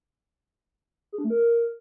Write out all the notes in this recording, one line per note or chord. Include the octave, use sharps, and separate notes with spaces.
G#4
D4
A3
A#4